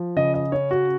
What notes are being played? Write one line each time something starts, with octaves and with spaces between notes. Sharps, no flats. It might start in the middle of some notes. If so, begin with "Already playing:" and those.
Already playing: F3
C#3 D#5
D#5
C#4 C#5
F#4